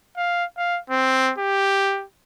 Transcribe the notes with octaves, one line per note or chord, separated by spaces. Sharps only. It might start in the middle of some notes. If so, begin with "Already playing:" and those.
F5
F5
C4
G4